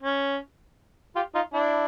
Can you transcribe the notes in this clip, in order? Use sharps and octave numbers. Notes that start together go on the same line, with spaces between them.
C#4
F4 G4
D#4 F4
D4 E4